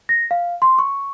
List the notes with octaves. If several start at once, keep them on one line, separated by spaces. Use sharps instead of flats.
A#6
F5
C6
C#6